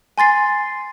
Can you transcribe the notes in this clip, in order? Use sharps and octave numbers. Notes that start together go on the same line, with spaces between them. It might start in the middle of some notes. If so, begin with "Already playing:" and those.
G#5 C6 A6 C7